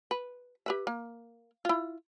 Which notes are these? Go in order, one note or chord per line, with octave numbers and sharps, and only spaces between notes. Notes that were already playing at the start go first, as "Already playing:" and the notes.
B4
G4 B4 E5
A#3
E4 F4